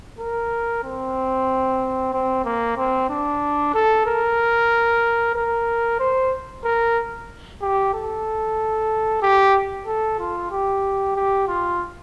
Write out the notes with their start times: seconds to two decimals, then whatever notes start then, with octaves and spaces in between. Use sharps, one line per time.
0.19 A#4
0.84 C4
2.13 C4
2.44 A#3
2.77 C4
3.09 D4
3.74 A4
4.06 A#4
5.35 A#4
5.99 C5
6.64 A#4
7.61 G4
7.94 A4
9.22 G4
9.86 A4
10.19 F4
10.51 G4
11.16 G4
11.48 F4